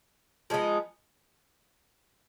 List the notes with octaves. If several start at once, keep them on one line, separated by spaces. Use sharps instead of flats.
F3 G#3 B3 D#4